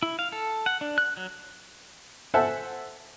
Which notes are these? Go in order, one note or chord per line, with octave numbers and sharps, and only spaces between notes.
E4
F5
A4
F#5
D4
F#6
F#3
A4 C5 E5 F#5 G#5 A5